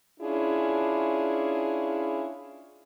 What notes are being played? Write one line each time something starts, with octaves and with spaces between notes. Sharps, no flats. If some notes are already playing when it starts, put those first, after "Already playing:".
C#4 D4 E4 F4 G#4